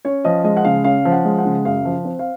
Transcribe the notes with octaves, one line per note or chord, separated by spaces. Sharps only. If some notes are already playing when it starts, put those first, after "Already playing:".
C#4 C#5
F3 D#5
G#3 D#5
F#5
C#3 F5
C#4 F5
F3
F#5
G#3
F#5
C#3
F#2 F5
F3
C4
F5